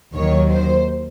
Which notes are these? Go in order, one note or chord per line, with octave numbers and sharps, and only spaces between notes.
D#2 D#3 F#3 C#5
C5